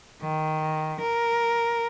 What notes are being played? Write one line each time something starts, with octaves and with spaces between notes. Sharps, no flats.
D#3
A#4